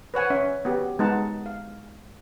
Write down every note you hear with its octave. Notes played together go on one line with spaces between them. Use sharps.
B4 C#5 F#5 G#5
C#4 E5
B3 F#4 G4
G#3 B3 D#4 F#5 A5
F5